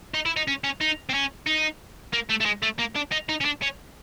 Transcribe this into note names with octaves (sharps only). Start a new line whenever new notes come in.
D#4
E4
D#4
C#4
C#4
D#4
C4
C#4
D#4
A#3
A3
A3
G#3
A3
A#3
D4
D#4
D#4
C#4
D4
C#4